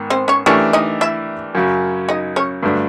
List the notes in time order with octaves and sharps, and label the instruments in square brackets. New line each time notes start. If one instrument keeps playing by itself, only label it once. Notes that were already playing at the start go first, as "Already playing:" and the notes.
Already playing: [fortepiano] G#2 D#3 B3
[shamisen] C4 C5
C#4 C#5
[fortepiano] E3 A3 D4 G4 A#4 [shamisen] C#4 C#5
[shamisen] D#4 D#5
E4 E5
[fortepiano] F#2 C#3 F#3
[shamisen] D#4 D#5
C#4 C#5
[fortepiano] G2 D3 F#3 A3 D4